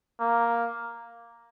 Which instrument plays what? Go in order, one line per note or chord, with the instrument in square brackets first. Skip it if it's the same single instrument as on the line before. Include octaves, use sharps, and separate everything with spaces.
[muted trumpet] A#3